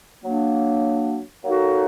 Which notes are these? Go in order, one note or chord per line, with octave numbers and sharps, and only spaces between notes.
F#3 A#3 D4
F#3 A#3 D#4 F#4 A4